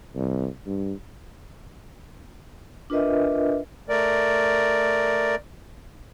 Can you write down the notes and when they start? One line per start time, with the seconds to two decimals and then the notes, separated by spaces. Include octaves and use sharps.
0.15 C2
0.67 G2
2.90 D4 F4 A#4 B4 D#5 E5
3.89 A3 A#4 D5